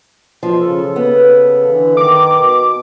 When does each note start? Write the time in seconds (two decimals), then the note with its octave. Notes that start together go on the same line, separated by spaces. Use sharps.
0.43 F3
0.60 C#3 A4
0.96 B3
1.66 D3 E3
1.97 D#3 D6
2.36 B2